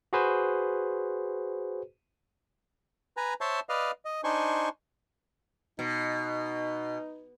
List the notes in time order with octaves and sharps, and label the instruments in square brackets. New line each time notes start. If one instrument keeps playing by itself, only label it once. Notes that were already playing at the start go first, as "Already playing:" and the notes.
[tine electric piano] F#4 G#4 B4 C5
[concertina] B4 G#5 A#5
C5 C#5 E5 A5 C6
B4 D5 D#5 F5
D#5
D4 D#4 C5 G#5 C6 C#6
[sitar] B2 [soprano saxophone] D#4